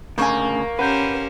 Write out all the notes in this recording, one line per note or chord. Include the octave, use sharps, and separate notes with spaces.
D2 C#3 A#3 G#5 C#6 G6
C#4 G4 B4 C5 F#5 A#5 G6